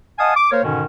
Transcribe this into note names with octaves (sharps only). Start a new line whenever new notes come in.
D#5 F5 F#5 G#5 A5 D#6
D6
A#3 A#4 C5 C#5
G#2 B2 D3 D#3 C#4